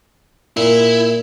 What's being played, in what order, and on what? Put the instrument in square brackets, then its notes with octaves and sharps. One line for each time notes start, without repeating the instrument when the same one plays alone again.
[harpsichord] A#2 [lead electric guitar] E4